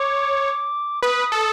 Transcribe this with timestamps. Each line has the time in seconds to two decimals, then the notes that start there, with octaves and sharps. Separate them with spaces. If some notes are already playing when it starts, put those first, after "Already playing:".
Already playing: C#5 D6
1.02 B4 D#6
1.32 A4